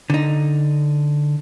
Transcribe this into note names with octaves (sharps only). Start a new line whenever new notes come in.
D3 D#4